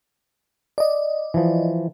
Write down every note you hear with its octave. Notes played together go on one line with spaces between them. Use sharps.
D5 D#5
E3 F3